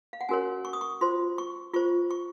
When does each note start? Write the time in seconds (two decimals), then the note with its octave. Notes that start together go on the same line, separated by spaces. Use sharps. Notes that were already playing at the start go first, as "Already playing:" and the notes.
0.13 F5
0.21 F#5
0.29 C#4 F#4 A#4 C#5 G#5
0.65 C#6
0.73 D#6
0.81 C#6
1.01 F4 C5 C6
1.38 C#6
1.74 F4 C5 C#6
2.11 C#6